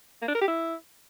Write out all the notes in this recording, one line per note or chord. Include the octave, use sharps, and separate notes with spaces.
A#3
D4
A#4
G4
E4